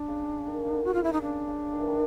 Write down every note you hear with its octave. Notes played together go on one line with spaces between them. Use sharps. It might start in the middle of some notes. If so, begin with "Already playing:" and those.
Already playing: D4
C#3
D#3
C#3
D3
F#4
C#3 F4
E4
D#4
C#3 D4
C#3
D#3
E3
D#3